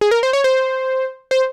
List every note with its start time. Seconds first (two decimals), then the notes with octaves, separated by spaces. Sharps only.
0.01 G#4
0.11 A#4
0.23 C5
0.33 C#5
0.44 C5
1.31 C5